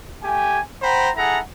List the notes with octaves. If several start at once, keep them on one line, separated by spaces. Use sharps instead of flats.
A3 G4 G#5
C5 F#5 G5 A#5 B5
E4 G#4 A4 F#5 A#5